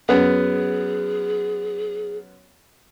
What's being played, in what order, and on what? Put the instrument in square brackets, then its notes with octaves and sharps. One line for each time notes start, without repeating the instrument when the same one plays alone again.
[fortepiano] F#2 B3 [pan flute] G#4